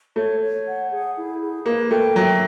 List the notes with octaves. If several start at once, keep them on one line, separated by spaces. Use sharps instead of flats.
A3 C#5
C#5
F#5
G#4
E4
G#4
A#3 B4
A3 G5
F#3 E5